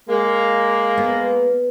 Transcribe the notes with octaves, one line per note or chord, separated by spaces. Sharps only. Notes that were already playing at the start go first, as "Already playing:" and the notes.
G#3 A#3
B3